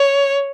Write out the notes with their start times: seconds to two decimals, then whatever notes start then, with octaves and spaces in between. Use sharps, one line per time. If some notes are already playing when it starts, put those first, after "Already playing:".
Already playing: C#5